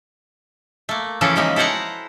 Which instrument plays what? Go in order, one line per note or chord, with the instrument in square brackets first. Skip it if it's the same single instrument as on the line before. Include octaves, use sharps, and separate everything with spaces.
[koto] A3 A#3
C#3 E3 F3 C#4 E4 A4
C#3 F3 G#3 A#3 D#4 E5
E4 A4 C5 F5 F#5 A#5